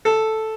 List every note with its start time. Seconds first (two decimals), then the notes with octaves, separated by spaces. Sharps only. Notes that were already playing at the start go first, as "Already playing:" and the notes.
0.05 A4